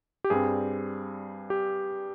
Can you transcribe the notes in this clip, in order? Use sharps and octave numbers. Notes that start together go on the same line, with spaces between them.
G4
G2 G3 C4 G#4
G4